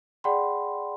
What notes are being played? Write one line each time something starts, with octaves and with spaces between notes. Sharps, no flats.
G#4 D5 F#5 G5 B5 C6